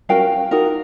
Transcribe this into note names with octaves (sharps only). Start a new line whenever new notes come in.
C#4 F#4 A#4 F5 G5
D#4 F#4 A#4